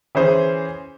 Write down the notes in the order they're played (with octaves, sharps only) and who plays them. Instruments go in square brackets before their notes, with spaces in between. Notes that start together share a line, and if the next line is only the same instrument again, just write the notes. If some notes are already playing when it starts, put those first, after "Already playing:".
[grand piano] E3 C#4 G#4 C5